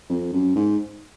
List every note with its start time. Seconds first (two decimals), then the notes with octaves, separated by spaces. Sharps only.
0.10 F2
0.32 F#2
0.56 G#2